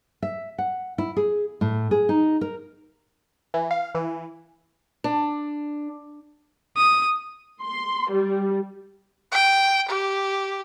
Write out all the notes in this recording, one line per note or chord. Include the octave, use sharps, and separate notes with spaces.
E5
F#5
E4
G#4
A2
G#4
D#4
A#4
E3
F5
E3
D4
D#6
C6
G3
G5
G4